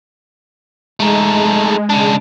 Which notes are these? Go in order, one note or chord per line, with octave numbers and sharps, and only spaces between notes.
G#3 A3 D#4
C#3 D4